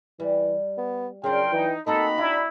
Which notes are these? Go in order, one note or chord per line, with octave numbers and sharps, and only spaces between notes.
E3 G3
B3
C#3 F#3 D4 F4 A#4 G5 C6
E3 D#4
A#3 C4 D#4 F#4 A4 A#4 A#5 B5
D4 E4